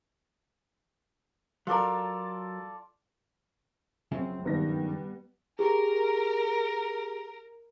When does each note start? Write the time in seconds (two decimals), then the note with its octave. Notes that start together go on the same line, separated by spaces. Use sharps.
1.67 F#3 F4 A4 A#4 D5
4.12 F#2 C#3 F3 C4
4.45 G2 D#3 G3 B3 A#6
5.59 G4 G#4 A#4